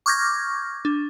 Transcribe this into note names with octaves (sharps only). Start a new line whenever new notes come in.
C#6 D6 F6 G6 G#6 A#6
D4